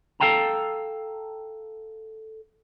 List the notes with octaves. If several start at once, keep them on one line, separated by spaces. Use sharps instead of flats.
A4 A#4 F5 G5 A5 A#5